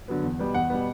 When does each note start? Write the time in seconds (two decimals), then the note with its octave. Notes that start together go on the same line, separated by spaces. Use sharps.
0.08 D3 F#3 B3
0.23 E2
0.39 B2 G3 B3
0.54 E2 F#5
0.70 B2 G3 B3